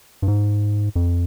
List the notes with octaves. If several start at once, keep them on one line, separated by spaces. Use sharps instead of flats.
G2
G#2
F2